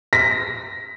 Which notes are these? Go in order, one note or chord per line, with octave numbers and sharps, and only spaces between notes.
A#6 B6